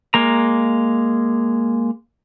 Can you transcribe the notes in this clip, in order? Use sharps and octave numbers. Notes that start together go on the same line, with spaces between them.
G#3 A#3 A#5